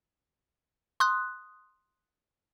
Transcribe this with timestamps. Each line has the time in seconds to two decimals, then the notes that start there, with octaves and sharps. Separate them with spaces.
1.00 C6 D#6 F#6